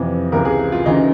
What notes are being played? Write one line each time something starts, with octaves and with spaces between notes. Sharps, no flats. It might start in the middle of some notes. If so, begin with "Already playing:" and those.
Already playing: F2 C3 E3
C#2 C3 E3 A#4
G#4
F4
D2 C#3 E3 D#4